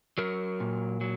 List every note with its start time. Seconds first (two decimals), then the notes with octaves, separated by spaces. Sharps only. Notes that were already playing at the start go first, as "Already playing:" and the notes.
0.18 F#3 A#4
0.60 A#2
1.01 F#3